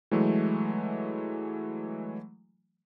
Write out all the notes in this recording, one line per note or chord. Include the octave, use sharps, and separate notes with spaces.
E3 F#3 G#3 A3